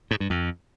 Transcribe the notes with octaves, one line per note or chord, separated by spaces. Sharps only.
G#2
G2
F2